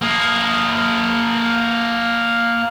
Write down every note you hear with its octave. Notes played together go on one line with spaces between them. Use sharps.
A#3 G#4